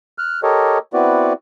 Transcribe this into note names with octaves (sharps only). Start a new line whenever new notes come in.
F6 F#6
G4 A4 A#4 C#5 D#5
B3 C4 E4 F#4 B4 D5